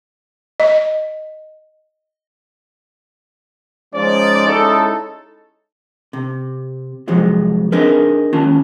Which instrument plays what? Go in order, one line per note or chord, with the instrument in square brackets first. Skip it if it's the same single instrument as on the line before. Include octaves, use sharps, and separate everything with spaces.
[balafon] D#5
[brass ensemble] F3 G#3 C#4 D#4 C5 D5
G#3 C#4 D#4 E4 A4
[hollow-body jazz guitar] C3
F2 C3 F3 F#3 G#3
C4 D4 D#4 G#4 A#4 B4
D#2 C#4 F4 A5